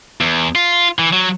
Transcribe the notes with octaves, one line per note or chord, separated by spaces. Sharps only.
E2
F4
E3
F#3